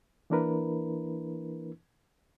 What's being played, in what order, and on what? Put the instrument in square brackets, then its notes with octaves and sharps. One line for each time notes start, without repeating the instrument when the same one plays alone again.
[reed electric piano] E3 A#3 D4 E4 A#4 B4